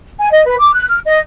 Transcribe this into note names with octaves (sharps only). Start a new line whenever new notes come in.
G#5
D#5
B4
D6
F#6
F6
D#5